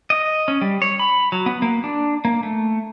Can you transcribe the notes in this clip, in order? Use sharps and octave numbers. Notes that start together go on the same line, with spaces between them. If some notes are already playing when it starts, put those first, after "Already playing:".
D#5
C#4
G3
C#5
B5
F#3
B3
A#3
D4
A#3
A3